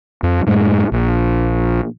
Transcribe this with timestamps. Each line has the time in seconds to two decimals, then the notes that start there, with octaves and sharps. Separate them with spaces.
0.23 F2
0.47 F#2 A2 G#3
0.92 A#1